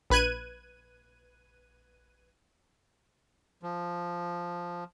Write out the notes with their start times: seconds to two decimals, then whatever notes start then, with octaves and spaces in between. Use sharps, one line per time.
0.10 A#1 B4 F#6 G#6 D#7
3.63 F3